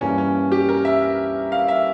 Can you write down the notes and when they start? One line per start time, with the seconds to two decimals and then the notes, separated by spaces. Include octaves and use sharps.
0.01 G2 E3 G3 A#3 C#4
0.18 C#4
0.52 G4
0.69 A#4
0.85 E5
1.52 F5
1.68 E5